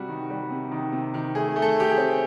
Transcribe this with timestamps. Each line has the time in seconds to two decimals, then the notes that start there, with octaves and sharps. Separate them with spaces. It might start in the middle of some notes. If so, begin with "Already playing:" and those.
Already playing: C3 G3 F#4
0.08 D#3
0.30 G3
0.50 C3
0.71 D#3
0.92 C3
1.14 D#3
1.35 A3 G#4
1.56 A3
1.62 A4
1.76 A3 G4
1.91 G#4
1.97 C4